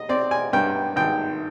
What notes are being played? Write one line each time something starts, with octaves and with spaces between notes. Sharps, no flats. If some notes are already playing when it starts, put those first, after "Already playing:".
Already playing: D#5
C4 D5
G#5
G2 G5
G#1 G5